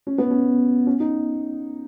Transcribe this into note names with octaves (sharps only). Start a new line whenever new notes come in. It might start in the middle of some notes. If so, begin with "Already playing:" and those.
C#4
B3
C#4
C#4
D#4